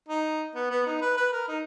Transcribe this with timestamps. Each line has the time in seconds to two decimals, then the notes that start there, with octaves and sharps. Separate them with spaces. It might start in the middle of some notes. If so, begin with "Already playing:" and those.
0.08 D#4
0.55 B3
0.70 B3
0.86 D#4
1.01 B4
1.17 B4
1.32 A#4
1.48 D#4